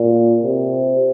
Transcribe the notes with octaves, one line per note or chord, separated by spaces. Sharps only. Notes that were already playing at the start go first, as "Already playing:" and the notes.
Already playing: A#2
C3